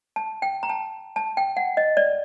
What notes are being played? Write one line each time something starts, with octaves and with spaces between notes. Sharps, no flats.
A5
G5
A#5
A5
A5
G5
F#5
D#5
D5